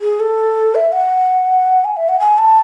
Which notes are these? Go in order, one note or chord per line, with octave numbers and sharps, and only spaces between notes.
G#4
A4
E5
F#5
G#5
E5
F#5
G#5
A5